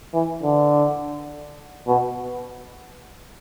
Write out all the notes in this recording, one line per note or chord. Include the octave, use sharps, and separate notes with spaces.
E3
D3
B2